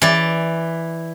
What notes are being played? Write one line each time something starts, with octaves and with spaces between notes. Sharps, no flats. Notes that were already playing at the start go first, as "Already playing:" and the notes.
E3 D5